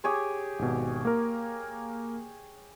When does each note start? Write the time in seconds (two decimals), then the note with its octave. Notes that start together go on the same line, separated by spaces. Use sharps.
0.04 G4 G#4 C#5
0.59 G#1 B2
1.05 A#3 A#4